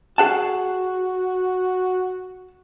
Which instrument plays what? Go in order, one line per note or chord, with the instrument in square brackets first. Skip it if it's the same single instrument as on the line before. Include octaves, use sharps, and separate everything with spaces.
[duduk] F#4 [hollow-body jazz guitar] G#4 F#5 A5